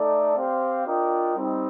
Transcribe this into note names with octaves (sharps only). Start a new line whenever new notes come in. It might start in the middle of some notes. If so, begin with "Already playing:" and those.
Already playing: A3 D#4 A4 D5
C4 G4 C5 F5
D4 F4 A#4 D#5 G5
G3 C4 D#4